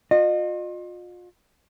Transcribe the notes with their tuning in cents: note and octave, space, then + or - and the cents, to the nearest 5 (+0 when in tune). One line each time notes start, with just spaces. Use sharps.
F4 +35 D#5 -35